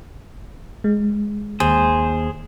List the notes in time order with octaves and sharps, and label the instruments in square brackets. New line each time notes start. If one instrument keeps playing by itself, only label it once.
[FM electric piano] G#3
[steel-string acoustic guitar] D#2 [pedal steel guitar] G#4 C5